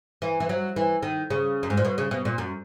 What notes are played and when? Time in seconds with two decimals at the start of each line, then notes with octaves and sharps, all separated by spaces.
0.22 E3
0.40 E3
0.49 F#3
0.76 E3
1.03 D#3
1.30 C#3
1.63 F#2
1.70 G#2
1.77 A#2
1.85 B2
1.98 C#3
2.11 B2
2.25 A#2
2.38 F#2